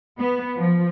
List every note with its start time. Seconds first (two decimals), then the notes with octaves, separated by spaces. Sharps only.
0.19 B3
0.58 F3